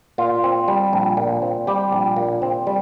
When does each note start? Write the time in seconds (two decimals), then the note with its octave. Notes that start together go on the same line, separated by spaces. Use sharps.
0.18 A#2 F4
0.44 C4
0.68 G3
0.93 A#1
1.17 A#2
1.42 C4
1.67 G3 G4
1.92 A#1
2.17 A#2
2.42 C4
2.67 G3